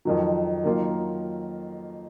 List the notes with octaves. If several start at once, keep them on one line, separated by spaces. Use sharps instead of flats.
F2 D#3 F#3
D#3 F#3 A#3 F4